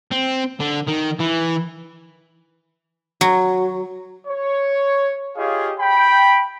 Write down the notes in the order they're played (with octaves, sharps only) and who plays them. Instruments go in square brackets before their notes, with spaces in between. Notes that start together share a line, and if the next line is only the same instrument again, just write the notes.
[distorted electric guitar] C4
D3
D#3
E3
[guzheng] F#3
[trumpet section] C#5
F4 G4 G#4 C#5 D#5 F5
G5 B5